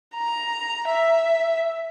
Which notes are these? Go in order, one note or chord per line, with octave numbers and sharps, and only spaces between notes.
A#5
E5